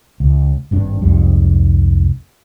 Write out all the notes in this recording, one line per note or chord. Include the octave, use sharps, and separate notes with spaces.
C#2
G#1 G2 D4
C2 F2 G#2 G3